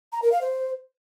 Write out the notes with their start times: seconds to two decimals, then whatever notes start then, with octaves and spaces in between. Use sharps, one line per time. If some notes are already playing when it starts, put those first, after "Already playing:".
0.12 A#5
0.22 A#4
0.32 F5
0.41 C5